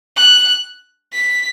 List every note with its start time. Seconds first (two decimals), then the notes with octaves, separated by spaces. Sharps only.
0.17 F#6
1.13 B6